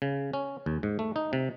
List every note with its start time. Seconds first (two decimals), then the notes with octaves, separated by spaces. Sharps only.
0.02 C#3
0.33 C#4
0.66 D#2
0.83 G#2
0.99 A3
1.16 D#4
1.33 C3